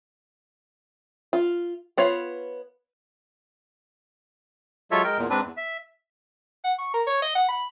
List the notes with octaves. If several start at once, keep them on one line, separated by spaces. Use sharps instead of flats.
F4
B3 F4 C#5 F5
F#3 G#3 F4 A4 C#5 E5
G#3 A#4 G5
E2 A#2
G#2 C4 D4 B4
E2
E5
F#5
C#6
A#4
C#5
D#5
F#5
B5